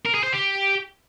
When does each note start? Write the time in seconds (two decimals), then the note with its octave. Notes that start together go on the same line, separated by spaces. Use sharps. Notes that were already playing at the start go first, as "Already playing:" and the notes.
0.05 A#4
0.14 G#4
0.23 C5
0.32 G4